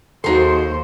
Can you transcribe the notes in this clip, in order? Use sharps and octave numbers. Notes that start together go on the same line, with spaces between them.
D#2 D#4 F#4 G#4 A4 C5 F#5 C6